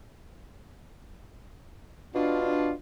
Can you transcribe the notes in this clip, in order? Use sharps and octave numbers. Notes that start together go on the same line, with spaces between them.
B2 D4 F4